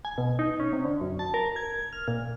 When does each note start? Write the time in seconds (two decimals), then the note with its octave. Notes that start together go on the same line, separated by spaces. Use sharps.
0.05 G#5
0.18 B2
0.39 D#4
0.60 C#4
0.73 C3
0.85 D3
1.01 F#2
1.19 A5
1.34 A#4
1.56 G#6
1.93 F6
2.08 A#2